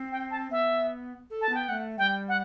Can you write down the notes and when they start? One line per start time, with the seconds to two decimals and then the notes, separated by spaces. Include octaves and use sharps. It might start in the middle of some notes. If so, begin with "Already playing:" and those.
Already playing: C4
0.12 G5
0.31 A5
0.51 B3 E5
1.30 A4
1.41 A5
1.49 B3
1.55 G5
1.69 A3 F#5
1.98 G3 G5
2.28 F#5